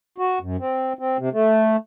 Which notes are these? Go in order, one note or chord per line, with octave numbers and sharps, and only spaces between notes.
F#4
F#2
C4
C4
C3
A3